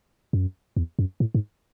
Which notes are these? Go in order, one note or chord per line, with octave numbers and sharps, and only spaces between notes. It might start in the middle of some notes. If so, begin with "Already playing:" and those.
F#2
E2
F#2
A2
G#2